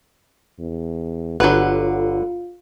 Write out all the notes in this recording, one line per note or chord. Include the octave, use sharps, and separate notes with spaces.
E2
G1 D3 F#3 F4 B4 F#5